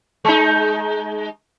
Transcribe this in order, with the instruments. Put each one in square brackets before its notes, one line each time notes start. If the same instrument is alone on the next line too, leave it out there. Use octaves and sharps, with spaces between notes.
[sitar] G#3 D#4